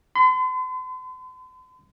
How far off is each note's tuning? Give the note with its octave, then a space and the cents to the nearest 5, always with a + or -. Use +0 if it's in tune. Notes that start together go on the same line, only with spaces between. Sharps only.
C6 -45